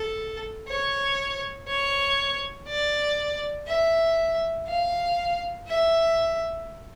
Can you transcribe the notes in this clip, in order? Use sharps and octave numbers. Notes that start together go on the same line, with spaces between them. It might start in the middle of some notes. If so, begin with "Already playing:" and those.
Already playing: A4
C#5
C#5
D5
E5
F5
E5